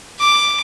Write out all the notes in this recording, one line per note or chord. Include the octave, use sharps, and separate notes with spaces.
D6